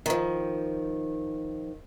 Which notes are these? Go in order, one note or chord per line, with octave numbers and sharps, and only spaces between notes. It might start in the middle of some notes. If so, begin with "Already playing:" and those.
D#3 F3